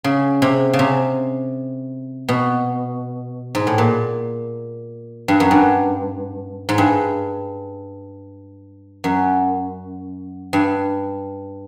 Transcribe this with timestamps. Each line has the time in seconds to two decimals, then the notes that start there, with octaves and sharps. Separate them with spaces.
0.04 C#3
0.42 C3
0.73 C#3
0.79 C3
2.28 B2
3.55 G#2
3.67 A2
3.78 A#2
5.28 G2
5.40 F#2
5.51 G2
6.69 G#2
6.78 G2
9.04 F#2
10.53 G2